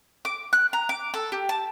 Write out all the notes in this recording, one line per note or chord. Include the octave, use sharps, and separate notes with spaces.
D6
F#6
A#5
D6
A4
G4
A5